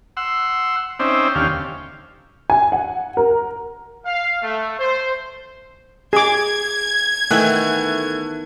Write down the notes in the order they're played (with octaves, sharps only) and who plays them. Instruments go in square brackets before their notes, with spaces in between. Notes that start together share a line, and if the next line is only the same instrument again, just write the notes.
[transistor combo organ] F#5 C6 E6
C4 C#4 D#4 C5 D5 E5
D#2 D3 C#4 G4 F5
[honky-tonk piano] G#5
F#5
A#4
[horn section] F5
A3
C5
[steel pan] G#4 D6 [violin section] G#6
[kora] D#3 E3 B3 [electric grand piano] A3 F#6